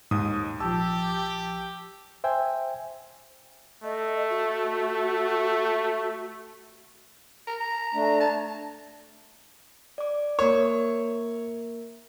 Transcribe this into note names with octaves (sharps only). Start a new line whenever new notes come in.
D#2 G#2 D#6
A#1 F3 G4 A5 E6
C5 E5 G5 G#5
A3 D#5
F#4
A#4
A#5
A3 D4
A5
D5 D6
A#3 A#4 C#5